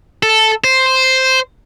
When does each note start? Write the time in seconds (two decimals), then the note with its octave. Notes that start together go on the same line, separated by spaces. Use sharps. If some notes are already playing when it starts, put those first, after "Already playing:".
0.23 A4
0.64 C5